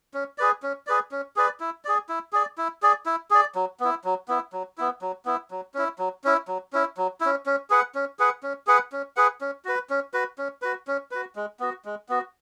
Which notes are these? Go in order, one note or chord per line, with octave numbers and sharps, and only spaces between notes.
C#4
G#4 B4 D5
C#4
G#4 B4 D5
C#4
G#4 B4 D5
E4
G#4 D5
E4
G#4 D5
E4
G#4 D5
E4
G#4 D5
F#3
B3 E4
F#3
B3 E4
F#3
B3 E4
F#3
B3 E4
F#3
C#4 E4
F#3
C#4 E4
F#3
C#4 E4
F#3
C#4 E4
C#4
G#4 B4 F#5
C#4
G#4 B4 F#5
C#4
G#4 B4 F#5
C#4
G#4 B4 F#5
C#4
F#4 B4
C#4
F#4 B4
C#4
F#4 B4
C#4
F#4 B4
G#3
B3 F#4
G#3
B3 F#4